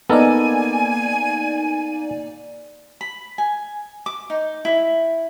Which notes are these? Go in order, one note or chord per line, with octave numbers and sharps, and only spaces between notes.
A#3 B3 D#4 A4 A#4 D5 G#5
B5
G#5
D6
D#4
E4